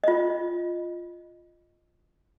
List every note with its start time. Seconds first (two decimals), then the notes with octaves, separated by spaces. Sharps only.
0.04 F4 D#5